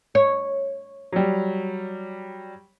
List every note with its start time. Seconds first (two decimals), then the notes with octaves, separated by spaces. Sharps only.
0.15 C#5
1.13 F#3 G3